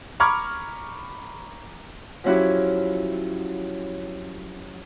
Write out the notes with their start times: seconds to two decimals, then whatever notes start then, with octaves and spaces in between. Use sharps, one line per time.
0.20 A#5 B5 C#6 D6 F6 G#6
2.24 F3 F#3 C#4 E4 F#4 G4